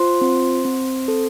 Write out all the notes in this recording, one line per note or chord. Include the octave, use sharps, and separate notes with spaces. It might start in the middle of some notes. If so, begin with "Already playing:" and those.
Already playing: F4 C5 C6
C4
C4
A4